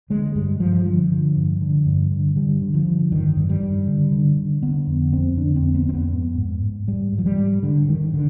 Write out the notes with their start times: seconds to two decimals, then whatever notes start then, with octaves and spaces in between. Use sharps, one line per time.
0.10 D3 G#3
0.35 G2 G3
0.60 G2 F3
0.86 D3 F3
1.11 D3
1.37 G2
1.61 D3
1.86 G2
2.11 D3
2.36 D3 G3
2.62 D3
2.74 F3
2.86 D3
3.12 G2 D#3
3.37 G2
3.49 G3
3.62 G2
3.87 D3
4.11 D3
4.37 D3
4.63 D3 B3
4.87 F2
5.12 F2 C4
5.37 D3 D4
5.56 C4
5.62 F2
5.74 B3
5.87 F2 C4
5.94 B3
6.13 G#2
6.38 G#2
6.63 G#2
6.87 G#2 G3
7.12 G#2
7.18 F3
7.26 G3
7.38 G#2
7.63 G#2 D3
7.88 G#2 D#3
8.14 D3